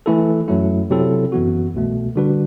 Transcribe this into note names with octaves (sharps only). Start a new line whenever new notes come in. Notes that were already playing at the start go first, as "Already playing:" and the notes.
E3 A3 E4 A4
F#2 F#3 A3 E4
C3 F#3 C4 E4 A4
F#2 E3 B3 F#4
C2 B2 A3
D3 G3 D4 F#4 B4